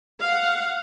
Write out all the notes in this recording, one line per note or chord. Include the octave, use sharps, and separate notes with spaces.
F5 F#5